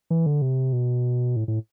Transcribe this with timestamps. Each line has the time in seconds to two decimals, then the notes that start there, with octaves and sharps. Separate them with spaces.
0.10 E3
0.26 D3
0.42 C3
0.73 B2
1.36 A2
1.48 A2